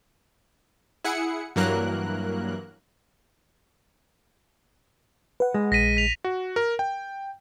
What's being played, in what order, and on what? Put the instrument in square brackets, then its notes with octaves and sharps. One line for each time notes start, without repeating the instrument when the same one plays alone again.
[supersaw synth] E4 G#4 F#5 C#7
G2 E3 F#3 A#3 A#4 F#6
[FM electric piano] B4 F#5
[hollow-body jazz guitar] G#3
[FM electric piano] A#1 [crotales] A#6 B6 D#7
[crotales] B6 F7
[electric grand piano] F#4
A#4
G5